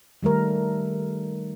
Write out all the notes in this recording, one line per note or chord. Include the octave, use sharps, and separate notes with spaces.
D#3 G3 A3 A#4